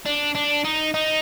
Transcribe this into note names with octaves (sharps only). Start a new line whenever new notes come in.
D4
D4
D#4
D#4